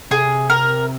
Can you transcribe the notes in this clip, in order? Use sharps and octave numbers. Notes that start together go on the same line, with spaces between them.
C3 G#4
A#4